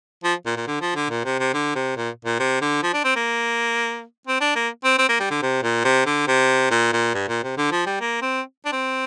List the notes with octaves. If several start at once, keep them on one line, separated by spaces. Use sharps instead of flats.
F3
A#2
A#2
D3
F3
D3
A#2
C3
C3
D3
C3
A#2
A#2
C3
D3
F3
D4
C4
A#3
C4
D4
A#3
C4
C4
A#3
G3
D3
C3
A#2
C3
D3
C3
A#2
A#2
G2
A#2
C3
D3
F3
G3
A#3
C4
D4
C4